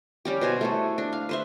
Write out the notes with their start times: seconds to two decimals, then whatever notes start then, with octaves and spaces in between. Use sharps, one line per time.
0.25 G3 C#4 G4
0.41 B2 C5 G#5
0.61 A3 E4 A4
0.98 D4
1.13 F5
1.29 B4 C5 E5